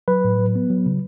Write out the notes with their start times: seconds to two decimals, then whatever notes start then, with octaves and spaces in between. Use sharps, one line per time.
0.08 F#3 B4
0.24 A2
0.39 F#3
0.55 B3
0.70 F#3
0.86 C#3